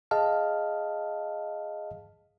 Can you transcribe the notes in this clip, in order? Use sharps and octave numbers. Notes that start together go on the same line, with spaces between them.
G#4 D#5 F5 A5 F6